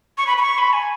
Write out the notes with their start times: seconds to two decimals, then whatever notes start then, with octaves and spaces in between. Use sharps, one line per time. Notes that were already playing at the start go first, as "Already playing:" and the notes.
0.18 C#6
0.27 B5
0.37 B5
0.42 C#6
0.58 B5
0.73 G#5